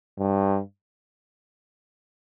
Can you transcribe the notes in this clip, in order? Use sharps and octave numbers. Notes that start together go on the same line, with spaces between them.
G2